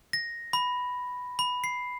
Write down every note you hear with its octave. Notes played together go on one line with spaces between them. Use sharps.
A#6
B5
B5
C7